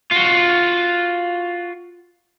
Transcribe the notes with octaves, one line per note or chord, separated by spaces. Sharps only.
F4 F#4